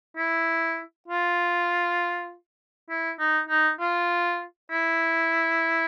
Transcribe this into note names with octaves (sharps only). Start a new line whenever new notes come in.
E4
F4
E4
D#4
D#4
F4
E4